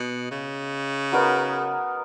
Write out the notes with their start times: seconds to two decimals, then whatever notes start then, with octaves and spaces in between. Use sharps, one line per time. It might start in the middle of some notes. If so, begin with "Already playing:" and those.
Already playing: B2 D#5
0.31 C#3
1.12 F#3 B3 D#4 A#4